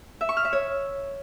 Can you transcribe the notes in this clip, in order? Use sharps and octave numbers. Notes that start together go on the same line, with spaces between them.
E5
C#6
F6
E5
C#5